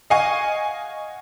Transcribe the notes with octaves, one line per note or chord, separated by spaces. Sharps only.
D#5 F5 F#5 G#5 C#6